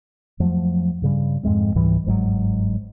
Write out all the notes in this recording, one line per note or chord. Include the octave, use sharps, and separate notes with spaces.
F2 F3 F#3 A3
G2 C#3 G3
F2 G#2 G#3 C4
C#2 G#2 E3 G3
G1 G#2 C#3 F#3